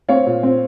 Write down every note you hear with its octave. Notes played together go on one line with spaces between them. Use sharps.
C4 C#5 F5
A#2
C4